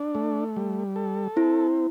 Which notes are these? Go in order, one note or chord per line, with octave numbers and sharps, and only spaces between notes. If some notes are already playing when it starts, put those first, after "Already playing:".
Already playing: D4
A3
G3
A4
C4 E4